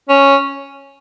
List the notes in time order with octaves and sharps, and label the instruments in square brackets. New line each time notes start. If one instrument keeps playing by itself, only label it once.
[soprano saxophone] C#4